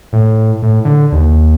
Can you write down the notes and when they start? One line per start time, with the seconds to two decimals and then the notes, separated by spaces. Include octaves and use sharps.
0.13 A2
0.63 A2
0.85 D3
1.12 D#2